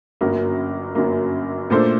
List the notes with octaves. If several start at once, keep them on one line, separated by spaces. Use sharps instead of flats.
G1 F#2 F#3 A#3
G1 F#2 F#3 A#3
A#2 A3 D4 A4 C5